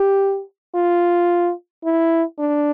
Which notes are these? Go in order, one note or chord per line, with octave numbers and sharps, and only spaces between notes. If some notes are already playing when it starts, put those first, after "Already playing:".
Already playing: G4
F4
E4
D4